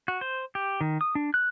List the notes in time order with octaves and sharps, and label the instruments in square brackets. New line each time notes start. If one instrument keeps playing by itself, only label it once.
[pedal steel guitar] F#4
C5
G4
D#3
D#6
D4
F#6